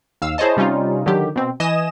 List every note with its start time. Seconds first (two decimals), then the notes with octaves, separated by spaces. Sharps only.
0.22 D#2 F5 E6
0.38 E4 G#4 C5 C#5 D#5 A5
0.57 C3 G3 C#4 D#4 F4
1.06 D3 D#3 F#3 G4
1.36 B2 C4
1.60 E3 D#5 G#5 D#6 E7